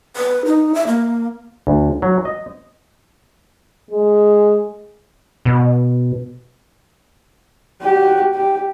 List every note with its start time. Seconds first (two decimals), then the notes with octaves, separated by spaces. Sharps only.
0.16 B4
0.45 D#4
0.74 E5
0.87 A#3
1.67 D2
2.02 F#3
2.25 D#5
3.91 G#3
5.45 B2
7.82 F#4 G4
8.35 G4